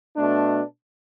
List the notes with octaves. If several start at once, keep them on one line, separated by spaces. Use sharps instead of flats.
B2 A3 D4